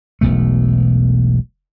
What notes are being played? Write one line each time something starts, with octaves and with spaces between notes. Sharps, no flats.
E1 B1 B2 A3